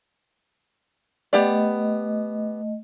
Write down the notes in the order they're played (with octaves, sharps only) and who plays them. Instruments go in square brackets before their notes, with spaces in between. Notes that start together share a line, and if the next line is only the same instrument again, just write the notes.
[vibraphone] A3 D#5 [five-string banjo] B3 G4 D5